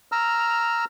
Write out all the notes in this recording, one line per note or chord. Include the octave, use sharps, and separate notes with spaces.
A#5 E6 F6